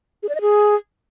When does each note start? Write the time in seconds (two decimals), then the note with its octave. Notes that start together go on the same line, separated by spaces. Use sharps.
0.23 G#4
0.29 D5
0.35 D#5
0.41 G#4